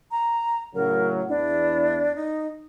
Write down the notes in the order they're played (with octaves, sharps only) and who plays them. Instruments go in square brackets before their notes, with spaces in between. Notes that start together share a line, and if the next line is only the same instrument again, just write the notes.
[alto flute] A#5
[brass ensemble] A2 C#3 F#3 [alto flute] A#4
[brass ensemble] E2 E4 [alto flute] D4
[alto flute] D#4